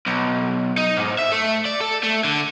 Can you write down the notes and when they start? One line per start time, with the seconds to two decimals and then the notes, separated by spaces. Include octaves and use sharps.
0.07 B1
0.78 D#4
0.96 G#2
1.18 E5
1.32 A3
1.66 D5
1.81 A4
2.04 A3
2.24 D3